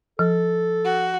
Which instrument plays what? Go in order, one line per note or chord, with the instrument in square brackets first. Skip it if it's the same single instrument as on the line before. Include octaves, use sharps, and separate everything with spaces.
[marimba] F3 [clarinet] A4
[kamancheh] F#4